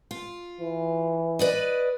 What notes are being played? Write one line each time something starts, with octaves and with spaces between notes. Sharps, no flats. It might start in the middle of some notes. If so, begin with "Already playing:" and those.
F4
E3
B4 D5 D#5